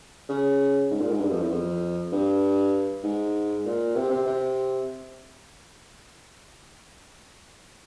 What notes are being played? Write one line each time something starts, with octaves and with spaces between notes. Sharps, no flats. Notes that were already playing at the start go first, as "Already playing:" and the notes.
C#3
G#2
A#2
G#2
G2
F2
E2
F2
G2
G#2
A#2
C3
C3
C3